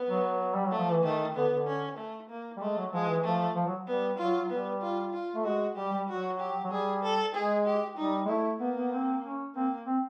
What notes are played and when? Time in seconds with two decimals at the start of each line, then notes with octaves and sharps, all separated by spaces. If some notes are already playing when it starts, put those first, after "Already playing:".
Already playing: B3
0.09 F#3
0.54 G3
0.67 F#3 A3
0.79 F3
0.91 E3
1.03 D#3 A3
1.35 D3 B3
1.52 D3
1.67 C#4
1.98 A3
2.29 A#3
2.57 G3
2.61 G#3 A3
2.77 F#3
2.93 F3 G#3
3.08 E3
3.24 F3 A3
3.55 F3
3.67 F#3
3.87 G3 B3
4.18 F#3 F4
4.50 G3 B3
4.82 F4
5.13 F4
5.35 A3
5.45 G#3 F#4
5.76 G3 G4
5.92 G3
6.08 F#3 F#4
6.39 G4
6.64 F#3
6.71 G3 G#4
7.03 A4
7.35 G#3 G#4
7.66 G4
7.97 G3 D#4
8.25 G#3
8.29 A3 E4
8.60 A#3 B3
8.77 B3
8.92 C4
9.23 C#4
9.55 A#3 C4
9.86 C4